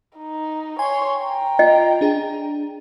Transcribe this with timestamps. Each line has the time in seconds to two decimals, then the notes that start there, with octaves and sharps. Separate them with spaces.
0.18 D#4
0.79 C#5 G#5 C6
1.18 G5 A#5
1.59 F4 D#5
2.01 D4 G#4